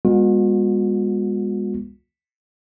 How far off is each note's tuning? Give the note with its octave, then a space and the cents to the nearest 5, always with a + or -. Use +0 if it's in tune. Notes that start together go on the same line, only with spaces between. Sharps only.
G#3 -40 B3 -30 F#4 -45